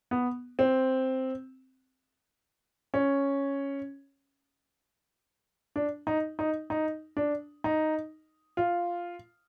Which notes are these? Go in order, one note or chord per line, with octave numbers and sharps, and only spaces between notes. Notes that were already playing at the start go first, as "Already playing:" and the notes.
B3
C4
C#4
D4
D#4
D#4
D#4
D4
D#4
F4